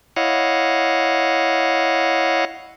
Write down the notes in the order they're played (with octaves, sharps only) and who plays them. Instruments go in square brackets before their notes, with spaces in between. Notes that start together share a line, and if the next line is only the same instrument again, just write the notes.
[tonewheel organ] E4 C#5 D#5 F5 F#5